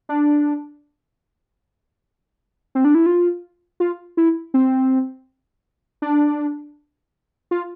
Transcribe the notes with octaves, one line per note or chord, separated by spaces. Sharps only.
D4
C4
D4
E4
F4
F4
E4
C4
D4
F4